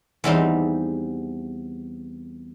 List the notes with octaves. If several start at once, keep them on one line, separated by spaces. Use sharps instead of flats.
E2 G3 C4 D#4